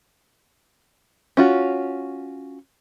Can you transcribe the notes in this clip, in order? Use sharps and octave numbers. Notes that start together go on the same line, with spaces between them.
C#4 F4 F#4